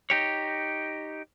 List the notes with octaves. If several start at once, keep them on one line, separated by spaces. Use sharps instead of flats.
D#4 G4 C#5